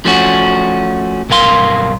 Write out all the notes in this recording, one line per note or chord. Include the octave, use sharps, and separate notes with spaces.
F3 A3 C#4 F#4
B1 G2 A#4 F5 C6